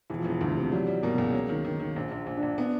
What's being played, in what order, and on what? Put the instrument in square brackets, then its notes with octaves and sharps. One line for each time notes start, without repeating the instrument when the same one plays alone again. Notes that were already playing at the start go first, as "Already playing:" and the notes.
[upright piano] E1 [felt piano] E3
[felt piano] F3
[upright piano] E1 [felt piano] E3
[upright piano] D2
C3
[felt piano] F#3 [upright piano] G3
[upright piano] G3
[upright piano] B2 [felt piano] A#3
[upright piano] C#2
F#3
D#3
D#3
D#3
A#1
A#1
A#1
[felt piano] D4
[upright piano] A#1
[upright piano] B3 [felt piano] D4